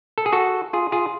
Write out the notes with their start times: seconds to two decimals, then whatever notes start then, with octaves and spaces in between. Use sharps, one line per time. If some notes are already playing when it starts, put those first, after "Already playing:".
0.18 A4
0.26 G#4
0.33 F#4 A4
0.73 F4 G#4
0.92 F4 G#4